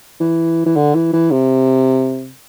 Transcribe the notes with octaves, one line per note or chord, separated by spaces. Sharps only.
E3
E3
D3
E3
E3
C3